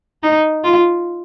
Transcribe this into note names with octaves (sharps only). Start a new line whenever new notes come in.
D#4
F4